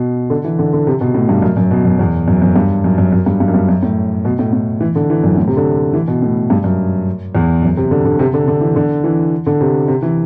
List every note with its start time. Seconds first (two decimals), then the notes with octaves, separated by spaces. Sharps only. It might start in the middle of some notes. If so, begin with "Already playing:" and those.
Already playing: B2
0.30 D3
0.44 E3
0.59 D3
0.73 D3
0.87 C3
1.01 B2
1.14 A2
1.29 G2
1.42 F#2
1.57 F#2
1.71 B2
1.85 F#2
1.99 E2
2.28 F#2
2.42 F#2
2.56 G2
2.84 F#2
2.98 F#2
3.12 F#2
3.26 G2
3.40 G2
3.48 F#2
3.54 G2
3.69 F#2
3.83 A2
4.25 B2
4.39 A2
4.53 A2
4.81 E3
4.95 D3
5.10 E3
5.24 F#2
5.37 A2
5.47 C3
5.57 D3
5.94 E3
6.08 B2
6.22 A2
6.50 G2
6.64 F#2
7.35 E2
7.63 F#2
7.77 C3
7.91 D3
8.05 D3
8.19 C3
8.34 D3
8.48 D3
8.61 E3
8.76 D3
9.04 E3
9.46 D3
9.61 C3
9.88 C3
10.03 E3